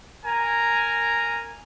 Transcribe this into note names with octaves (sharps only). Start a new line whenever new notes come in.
A#4 G#5 A#5